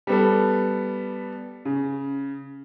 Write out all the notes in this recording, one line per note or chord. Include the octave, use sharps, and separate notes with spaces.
G3 B3 A4
C#3